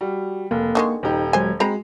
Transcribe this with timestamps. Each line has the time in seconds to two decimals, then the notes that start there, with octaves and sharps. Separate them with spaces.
0.01 G3 F#4
0.51 F1 A#3
0.75 D3 D#3 G#3 C#6
1.03 D#1 D#4 G4 C5
1.33 F#3 G#3 C5 G#5 G#6
1.60 G#3 C4 F#4 A#5 B5